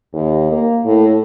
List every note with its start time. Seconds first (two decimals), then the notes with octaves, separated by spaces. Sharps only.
0.13 D#2
0.52 A#3
0.85 A2